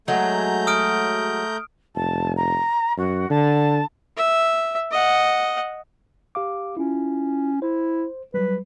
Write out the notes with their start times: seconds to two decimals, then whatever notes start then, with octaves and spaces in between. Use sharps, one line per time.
0.08 F#3 G#3 A3 A#5 G6
0.67 D#6 F6 D7
1.95 F1 A5
2.36 A#5
2.98 F#2 F#4
3.30 D3 A5
4.16 E5
4.91 D#5 F#5
6.35 G4 F5 D6
6.77 C#4 E4 F4
7.62 E4 C5
8.34 F#3 G3 B4